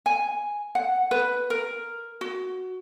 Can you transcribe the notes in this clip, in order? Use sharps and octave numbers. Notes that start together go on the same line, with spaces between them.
G#5
F#5
B4
A#4
F#4